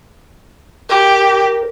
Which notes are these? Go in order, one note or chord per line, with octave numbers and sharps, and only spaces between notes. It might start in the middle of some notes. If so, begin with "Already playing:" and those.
G4 A#4